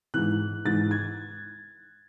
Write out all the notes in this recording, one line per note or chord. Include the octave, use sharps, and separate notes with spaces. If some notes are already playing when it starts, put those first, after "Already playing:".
G#2 E3 F#6
G#2 E3 A6
G#6